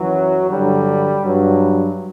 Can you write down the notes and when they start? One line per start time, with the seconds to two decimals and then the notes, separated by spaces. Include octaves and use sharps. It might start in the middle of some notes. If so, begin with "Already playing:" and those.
Already playing: F#2 E3 F#3
0.49 G2 D3 F#3 G3
1.22 G2 F#3